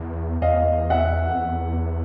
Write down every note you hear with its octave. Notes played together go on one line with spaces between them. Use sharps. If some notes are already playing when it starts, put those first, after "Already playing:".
Already playing: E2
E2 D#5 F5
E5 F#5
F2
E2